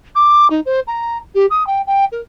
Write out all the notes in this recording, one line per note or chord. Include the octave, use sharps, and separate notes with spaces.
D6
D#4
C5
A#5
G4
D#6
G5
G5
A#4